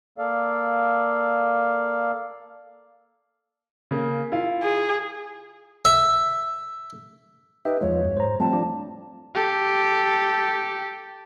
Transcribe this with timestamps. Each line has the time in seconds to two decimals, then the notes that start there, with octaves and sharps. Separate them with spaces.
0.18 A#3 A4 D5 F5
3.91 C#3 A#3
4.32 E4 F4 F5
4.63 G#4
5.85 E5
7.65 D#4 G4 B4 E5
7.81 E2 F3 G#3 C#5
8.05 F#2
8.17 G#2 C5 A#5
8.40 F3 G3 A3 C4 A5
8.53 F3 D4
9.35 G4 A4